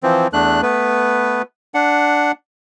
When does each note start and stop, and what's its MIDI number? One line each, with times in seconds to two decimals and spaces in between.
0.03 0.27 52
0.03 0.27 53
0.03 0.27 60
0.33 0.61 40
0.33 0.61 57
0.33 0.61 62
0.33 0.61 90
0.62 1.42 57
0.62 1.42 59
0.62 1.42 71
1.74 2.32 62
1.74 2.32 78